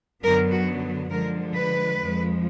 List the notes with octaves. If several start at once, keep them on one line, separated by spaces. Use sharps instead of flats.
F#2 D3 F#3 B3 A#4
F#4
D3 F3 G#3 A#4
B4
F2 F3 G#3